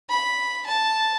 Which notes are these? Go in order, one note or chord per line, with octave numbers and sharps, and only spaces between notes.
B5
A5